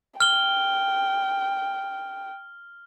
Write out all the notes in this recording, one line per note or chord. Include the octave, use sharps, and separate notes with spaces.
G5 F6 G7